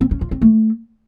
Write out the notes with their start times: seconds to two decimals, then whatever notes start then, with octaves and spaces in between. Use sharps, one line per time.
0.01 C4
0.11 C#4
0.21 F4
0.31 C4
0.42 A3